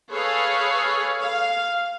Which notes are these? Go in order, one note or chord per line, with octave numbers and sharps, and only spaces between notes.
G#4 A4 B4 C#5 F5
F5